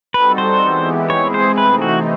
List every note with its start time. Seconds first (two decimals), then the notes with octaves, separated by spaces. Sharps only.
0.14 G3 C4 D#4 F#4 A4 B4
0.38 C5
0.63 E3 G#3 B3 E4 G4
1.10 G#3 C4 E4 G#4 C#5
1.34 C5
1.58 C3 E3 A3 C4 D#4 B4
1.82 F#4